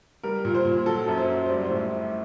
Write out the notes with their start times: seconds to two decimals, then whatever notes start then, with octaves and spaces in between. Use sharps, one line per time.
0.23 G3 A#4
0.45 A#2
0.55 C5
0.65 A#2
0.86 F#3 A4
1.08 F#2
1.18 C5
1.28 F#2
1.45 C5
1.49 G3 D5
1.65 C5
1.70 A2